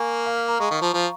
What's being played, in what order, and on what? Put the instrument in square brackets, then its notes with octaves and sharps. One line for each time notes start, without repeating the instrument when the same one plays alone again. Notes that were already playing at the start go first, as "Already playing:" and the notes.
Already playing: [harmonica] A#3 [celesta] G#5 A#5 C#6
[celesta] F5
F5
A#5
[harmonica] G#3 [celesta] C#6
[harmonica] D#3
F3
F3